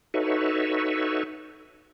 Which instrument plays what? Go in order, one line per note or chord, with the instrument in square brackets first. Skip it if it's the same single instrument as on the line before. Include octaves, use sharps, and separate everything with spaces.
[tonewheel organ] D#4 F#4 A4 B4 C#5 E5